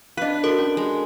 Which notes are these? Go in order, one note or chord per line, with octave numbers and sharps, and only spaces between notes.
D4 B4 D#5 F5
F#4 A4 A#4
C#4
G#3